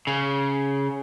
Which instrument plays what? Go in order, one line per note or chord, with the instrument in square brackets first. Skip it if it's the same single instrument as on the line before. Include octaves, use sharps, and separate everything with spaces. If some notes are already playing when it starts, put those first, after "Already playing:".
[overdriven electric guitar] C#3